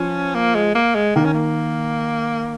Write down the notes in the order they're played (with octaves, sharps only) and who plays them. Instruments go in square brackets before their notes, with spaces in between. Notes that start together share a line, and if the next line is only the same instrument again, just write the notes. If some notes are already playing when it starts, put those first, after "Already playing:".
Already playing: [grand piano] F3 [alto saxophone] C#4
[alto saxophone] A#3
G#3
A#3
G#3
[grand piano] D#3 [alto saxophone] A#3
[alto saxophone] C#4
A#3